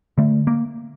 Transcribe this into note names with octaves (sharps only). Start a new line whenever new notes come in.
D3 A3
A#3